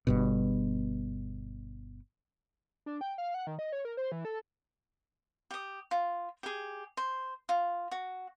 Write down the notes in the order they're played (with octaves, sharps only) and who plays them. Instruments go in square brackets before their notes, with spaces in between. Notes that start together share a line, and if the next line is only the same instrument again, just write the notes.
[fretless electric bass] G1 G2 B2
[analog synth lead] D4
G5
F5
F#5
D#3
D#5
C#5
A#4
C5
E3
A4
[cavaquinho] G4 D#6
F4
G4 G#4
C5
F4
F#4